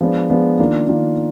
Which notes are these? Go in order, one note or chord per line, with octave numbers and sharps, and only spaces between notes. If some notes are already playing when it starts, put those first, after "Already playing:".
F3 G#3 B3 D4
F3 G#3 B3 D4
D#3 A#3 D4 F4
D#3 A#3 D4 F4